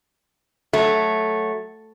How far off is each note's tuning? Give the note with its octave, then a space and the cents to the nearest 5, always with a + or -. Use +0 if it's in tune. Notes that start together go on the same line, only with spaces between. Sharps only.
F#3 +0 A3 -5